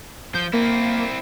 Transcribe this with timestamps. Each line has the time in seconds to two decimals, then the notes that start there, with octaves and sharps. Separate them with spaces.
0.35 F3 G6
0.53 A#3 C4 E4